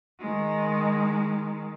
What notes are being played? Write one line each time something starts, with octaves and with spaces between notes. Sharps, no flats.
D#3 G#3